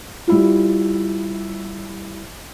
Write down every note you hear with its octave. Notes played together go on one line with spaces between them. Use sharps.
G3 E4 F4